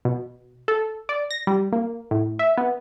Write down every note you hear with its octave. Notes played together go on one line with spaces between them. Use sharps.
B2
A4
D5
A#6
G3
A#3
A2
E5
B3